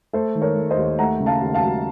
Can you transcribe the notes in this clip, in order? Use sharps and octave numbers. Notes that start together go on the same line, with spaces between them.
A3 A4 C5
D#3
A#4 C#5
A3
C5 D#5
D#2
A3 F#5 A#5
C#3
F5 A5
D#2
F5 A5
F#3